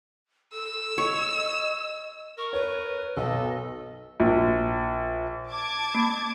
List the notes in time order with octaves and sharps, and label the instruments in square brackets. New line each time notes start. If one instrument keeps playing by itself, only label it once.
[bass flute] A4 [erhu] E6
[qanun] C#5 [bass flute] D#5
[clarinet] A#4 [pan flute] C#6
[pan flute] B4 [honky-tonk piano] C#5
[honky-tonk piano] B1 [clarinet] A4 [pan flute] D#5
[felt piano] A#1
[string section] A5 D6 G#6
[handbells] A#3